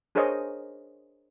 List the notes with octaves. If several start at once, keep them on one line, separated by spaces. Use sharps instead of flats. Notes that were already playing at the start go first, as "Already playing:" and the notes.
D4 G#4 A#4 C5 C#5 D#5